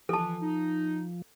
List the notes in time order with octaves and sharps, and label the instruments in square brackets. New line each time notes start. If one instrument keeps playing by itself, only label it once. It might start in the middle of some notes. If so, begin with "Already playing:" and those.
[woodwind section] E3 [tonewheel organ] F3 [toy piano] A4 A5
[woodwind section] D#4